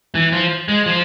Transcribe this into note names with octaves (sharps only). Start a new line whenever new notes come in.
E3
F3
G#3
F3